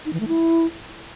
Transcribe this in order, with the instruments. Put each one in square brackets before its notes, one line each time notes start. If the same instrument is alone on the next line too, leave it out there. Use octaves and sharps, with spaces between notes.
[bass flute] D#4
E3
A3
E4